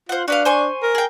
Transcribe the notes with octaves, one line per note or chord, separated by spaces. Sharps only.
F4 C5 F#5
D4 F#4 B4 F5
C5 G#5 C#6
A#4
G#4 G5